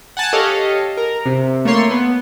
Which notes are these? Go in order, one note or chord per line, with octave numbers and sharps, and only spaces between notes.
F#5 G#5 A5
G4 A4 C#5 D#5 F5
A#4
C3
A3 A#3 C#5 C6
B3